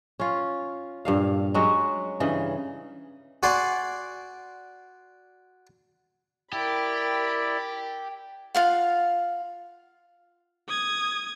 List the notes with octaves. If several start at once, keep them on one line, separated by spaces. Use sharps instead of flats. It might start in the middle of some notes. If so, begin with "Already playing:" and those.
C#4 F4
G2 A#2 F5
F#3 G#3 C#4 F#4
G2 C#3 E3 D#5
F#4 D5 G#5 C6
E4 G4 A#4 D5 B5
F4 F5 F#5
D#6 G#6